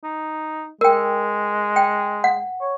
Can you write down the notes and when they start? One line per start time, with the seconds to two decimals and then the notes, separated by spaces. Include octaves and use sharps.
0.04 D#4
0.81 G#3 A#4 G5
1.76 G5
2.24 F#5
2.61 C#5